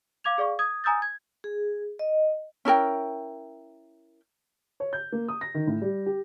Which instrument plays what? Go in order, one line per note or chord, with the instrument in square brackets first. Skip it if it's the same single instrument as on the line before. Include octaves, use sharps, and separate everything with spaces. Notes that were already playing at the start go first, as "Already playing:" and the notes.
[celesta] F5 D6 G#6 F7
G#4 D5 F5 C#6
D#6 G#6
G#5 A#5 D#6 E6 G6 A6
G#6
[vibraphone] G#4
D#5
[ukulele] C#4 E4 A#4 G5
[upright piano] C#5
G6
A#3
D#6
A#6
D#3
A2
G3
G4